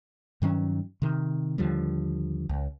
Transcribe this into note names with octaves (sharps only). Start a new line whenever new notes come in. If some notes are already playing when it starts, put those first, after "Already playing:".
G2 D#3 F#3 C#4
C3 D#3
D#2 D3 F3 G3
C#2